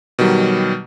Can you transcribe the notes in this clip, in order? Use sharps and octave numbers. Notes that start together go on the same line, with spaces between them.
B2 D#3 F#3 G3